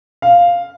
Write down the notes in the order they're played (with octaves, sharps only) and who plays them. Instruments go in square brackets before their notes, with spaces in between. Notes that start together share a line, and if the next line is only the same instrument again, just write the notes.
[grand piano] F5